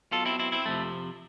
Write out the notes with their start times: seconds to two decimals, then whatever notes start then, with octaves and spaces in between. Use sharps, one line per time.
0.11 B1 B2 F4 A4
0.25 C4 E4
0.39 C4 E4
0.52 C4 E4
0.66 F2 C3 F3 A3